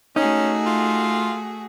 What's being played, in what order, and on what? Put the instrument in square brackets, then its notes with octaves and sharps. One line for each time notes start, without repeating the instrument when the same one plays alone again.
[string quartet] A3 F#4 G#4 [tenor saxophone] C#4 [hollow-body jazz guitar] D#4
[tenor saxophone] F4